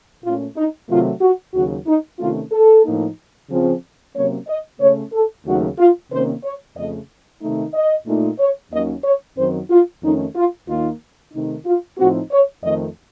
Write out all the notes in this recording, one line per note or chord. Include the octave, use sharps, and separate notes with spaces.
A#2 A3 C#4 F4
D#4
C3 D#3 F#3 A3 F4
F#4
D#2 C#3 F#3 F#4
D#4
C3 D#3 A3 C#4 F4
A4
A2 F3 A#3 D#4
C#3 F3 C4
C3 F#3 A#3 C#4 C#5
D#5
C#3 A3 C#4 C#5
A4
D#2 C#3 F#3 A3 D#4 F#4
F4
C3 D#3 A#3 C#4 C5
C#5
F2 C#3 A3 D#5
C3 D#3 A3 D#4
D#5
A#2 A3 D#4
C#5
D#2 D#3 F#3 A#3 C#4 D#5
C#5
F#2 D#3 F#3 C4 D#4 C5
F4
F2 D#3 A3 C#4 D#4
F4
D#2 D#3 A#3 D#4 F4
C3 D#3 A3 D#4
F4
A2 F3 C4 D#4 F#4
C#5
F2 D#3 A3 C4 D#5